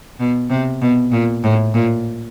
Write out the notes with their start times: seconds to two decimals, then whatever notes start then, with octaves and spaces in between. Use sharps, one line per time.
0.19 B2
0.50 C3
0.81 B2
1.11 A#2
1.43 A2
1.73 A#2